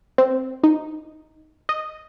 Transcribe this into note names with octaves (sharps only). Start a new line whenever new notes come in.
C4
D#4
D#5